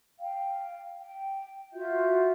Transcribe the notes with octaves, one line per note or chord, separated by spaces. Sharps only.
F5 G5
G5
F4 F#4 E5 G6